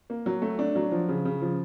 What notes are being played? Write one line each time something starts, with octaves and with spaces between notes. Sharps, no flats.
A#3
F#3
A3
D4
F#3
F3
C#3
C#3
F3